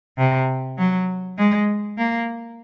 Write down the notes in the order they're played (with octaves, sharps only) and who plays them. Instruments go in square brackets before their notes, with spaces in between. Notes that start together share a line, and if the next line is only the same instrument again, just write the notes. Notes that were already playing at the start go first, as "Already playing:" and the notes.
[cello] C3
F#3
G#3
A#3